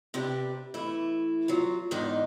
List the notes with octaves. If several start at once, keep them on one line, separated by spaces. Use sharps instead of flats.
C3 D4 G4 B4
E3 A3 E4
F#3 F4
E2 G#2 D#3 D4 D#4